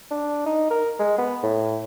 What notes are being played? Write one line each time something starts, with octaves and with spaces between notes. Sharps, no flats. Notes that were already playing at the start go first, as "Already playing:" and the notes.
D4
D#4
A#4
G#3
B3
A2